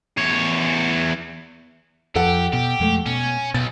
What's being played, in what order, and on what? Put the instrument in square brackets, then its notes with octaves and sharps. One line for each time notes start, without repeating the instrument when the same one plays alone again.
[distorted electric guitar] E2 C#5
[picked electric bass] F2 F3 [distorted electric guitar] G4 [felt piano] A4 F#5
[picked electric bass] B2 [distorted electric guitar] G4
[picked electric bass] F2 G#3 A3
[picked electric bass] B2 [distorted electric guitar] C#4
[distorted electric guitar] B1 [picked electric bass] B2 [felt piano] A6